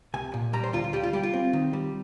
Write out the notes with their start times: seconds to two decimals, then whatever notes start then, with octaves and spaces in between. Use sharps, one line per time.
0.14 C2 G#5
0.34 A#2
0.53 G3 A#5
0.64 C5
0.73 D2 F4
0.84 F4
0.93 G3 G4
1.03 F4
1.13 G3 G4
1.23 F4
1.33 C4
1.53 D#3
1.73 G3